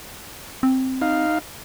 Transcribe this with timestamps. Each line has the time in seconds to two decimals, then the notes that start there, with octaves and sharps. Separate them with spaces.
0.63 C4
1.02 D#4 F5